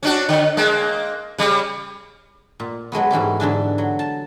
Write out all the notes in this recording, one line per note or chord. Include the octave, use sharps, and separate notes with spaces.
C#4 D4 F#4
D3
G#3 A#3
C#3 G3
A#2
F#3 G#3 A3 B3
G#2 E3 C#4 G4
G#2 D3 E3 D4
F#3
A5